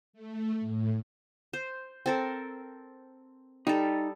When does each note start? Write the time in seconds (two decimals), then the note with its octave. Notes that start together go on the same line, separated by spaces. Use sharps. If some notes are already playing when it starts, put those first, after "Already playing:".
0.13 A3
0.60 A2
1.53 C5
2.06 C4 A4 A#4
3.67 G3 D#4 A4